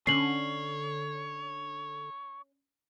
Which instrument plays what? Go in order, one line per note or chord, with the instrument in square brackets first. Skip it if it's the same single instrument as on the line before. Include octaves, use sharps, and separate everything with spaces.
[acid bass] D3 [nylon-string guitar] C#4 [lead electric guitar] C#5 [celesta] C7 F#7